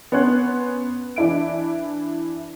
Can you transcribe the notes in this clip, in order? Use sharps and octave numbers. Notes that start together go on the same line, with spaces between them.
B3 C#4 C#5 C6 F#6
E3 D4 E4 D7